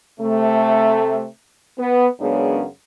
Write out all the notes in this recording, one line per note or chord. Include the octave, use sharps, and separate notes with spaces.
C3 A3
B3
F#2 C#3 G#3 B3 D4